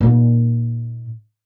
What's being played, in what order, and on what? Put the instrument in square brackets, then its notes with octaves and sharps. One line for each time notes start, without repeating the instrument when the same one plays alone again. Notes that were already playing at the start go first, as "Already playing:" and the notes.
[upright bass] A#2 D#4